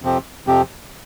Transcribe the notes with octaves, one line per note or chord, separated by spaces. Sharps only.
F2 C3 F3 C4 G4
F2 C3 F3 C4 G4